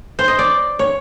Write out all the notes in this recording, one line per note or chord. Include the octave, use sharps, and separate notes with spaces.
C5
D#5
D5
C#5